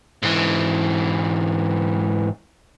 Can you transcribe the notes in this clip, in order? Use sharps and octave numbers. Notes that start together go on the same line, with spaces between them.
G#2 E3